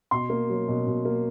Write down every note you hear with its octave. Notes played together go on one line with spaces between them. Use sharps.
B2 C6
A#3
F#3
B2
B2
A#3